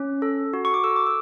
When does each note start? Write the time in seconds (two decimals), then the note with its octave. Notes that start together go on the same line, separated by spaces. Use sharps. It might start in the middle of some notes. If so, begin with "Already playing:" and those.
Already playing: C#4
0.22 A4
0.53 F#4
0.65 C#6
0.74 D6
0.84 A4 E6
0.96 D6
1.07 E6